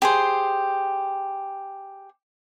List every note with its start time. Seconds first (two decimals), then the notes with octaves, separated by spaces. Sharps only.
0.02 G4 G#4 C5